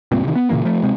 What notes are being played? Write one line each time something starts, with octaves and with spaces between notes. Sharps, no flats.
C#2 G2 A#2 C4
C3 D#3
B3
A#2 C#3 E3 A#3
F3 A3
C3 G#3 C4